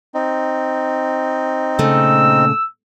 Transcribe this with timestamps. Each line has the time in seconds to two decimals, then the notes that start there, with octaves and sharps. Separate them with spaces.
0.14 C4 D#4
1.79 A#2 C#3 A3 E6